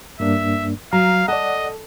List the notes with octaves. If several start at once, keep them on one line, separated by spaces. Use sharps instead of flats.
G2 A#3 D4 E5
F#3 F5 A#5
A4 D5 D#5 F#5